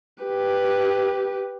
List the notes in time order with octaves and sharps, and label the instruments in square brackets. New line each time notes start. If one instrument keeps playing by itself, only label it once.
[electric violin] G4 B4